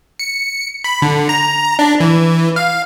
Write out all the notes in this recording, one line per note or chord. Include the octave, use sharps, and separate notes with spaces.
C#7
B5
D3
A#5
D4
E3
F5